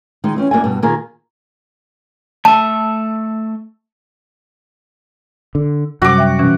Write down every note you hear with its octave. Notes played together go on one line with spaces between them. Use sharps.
D#3 G#3 D#4
E3 C4 C#4
F#2 A#3 F#4 D5 E5 G#5
G2 B2
A#2 D#3 A#3 G#4 A#4 G#5
A3 E5 A5
D3
F#2 C3 G3 F#4 D6
E5 G5
B2 E3 C#4